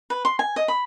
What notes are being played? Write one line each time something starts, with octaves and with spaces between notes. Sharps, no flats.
B4
C6
G#5
D#5
B5